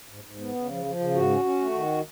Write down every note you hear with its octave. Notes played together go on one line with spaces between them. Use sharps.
G#2
G#2
B3
C#3
F3
F3
C#3
G#2 F#4
C#4
C#4
A3
D#3